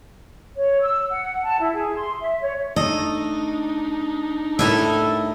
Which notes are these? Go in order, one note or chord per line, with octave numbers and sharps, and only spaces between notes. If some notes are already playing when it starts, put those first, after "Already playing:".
C#5
E6
F#5
A5
E4
G#4
C6
E5
C#5
A3 D4 D#4 A4 D#5
A2 G3 E4 A4 A#4 D#5 E5